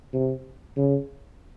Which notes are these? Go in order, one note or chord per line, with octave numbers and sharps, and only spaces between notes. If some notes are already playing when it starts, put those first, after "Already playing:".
C3
C#3